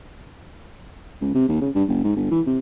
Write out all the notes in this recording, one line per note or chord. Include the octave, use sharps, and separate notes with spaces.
C#2
C3
D#2
C#3
G2
F#1
G#2
G1
E3
C3